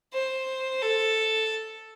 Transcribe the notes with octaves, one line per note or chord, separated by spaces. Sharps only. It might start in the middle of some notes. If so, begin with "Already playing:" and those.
C5
A4